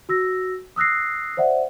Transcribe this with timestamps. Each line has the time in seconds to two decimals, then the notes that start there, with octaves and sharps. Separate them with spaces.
0.09 F#4 E6 A#6
0.76 D#6 E6 F#6 A#6 C7
1.37 C5 D5 E5 F#5